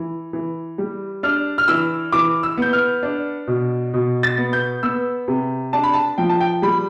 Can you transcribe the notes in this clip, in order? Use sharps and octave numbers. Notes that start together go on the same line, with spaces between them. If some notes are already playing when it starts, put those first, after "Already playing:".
Already playing: E3
E3
G3
D4 F6
F6
E3 E6
E3 D6
E6
B3 G6
F6
D4
B2
B2
A6
B3
G6
B3 E6
C3
D4 A5
B5
A5
F3 G5
A5
G5
G3 B5